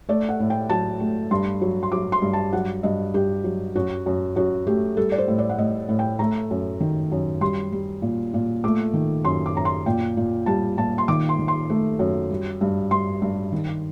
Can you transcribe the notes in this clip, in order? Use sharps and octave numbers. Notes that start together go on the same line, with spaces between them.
A3 D5
F#5
A2
G5
F#3 A5
A3
G2 C6
F#3
C6
F#3 D6
C6
G2
A5
F#3 F#5
G2 D#5
G2 G4
F#3
F#2 F#4
F#2
F#2 F#4
A3 G4
G3 A4
D5
C5
A2
D5
F#5
A2 D#5
A2
G5
A3 A#5
F#2
D#3
F#2
G3 C6
G3
A#2
A#2
A3 D6
D#3
F#2 C6
D6
F#2 A#5
C6
A#2 G5
A#2
G3 A5
A#2 A5
C6
D#3 D6
C6
D#3
C6
A3
F#2
G3
G2
G2 C6
G2
D#3